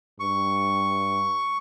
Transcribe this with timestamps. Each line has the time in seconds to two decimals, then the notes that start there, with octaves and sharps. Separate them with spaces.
0.20 G2 C#6